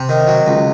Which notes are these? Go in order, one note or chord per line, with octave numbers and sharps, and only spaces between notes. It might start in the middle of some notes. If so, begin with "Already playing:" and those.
Already playing: C3
D#3
F#3
C#2